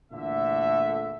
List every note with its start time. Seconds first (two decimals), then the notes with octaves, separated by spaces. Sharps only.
0.12 E2 A#2 D3 E3 A3 E5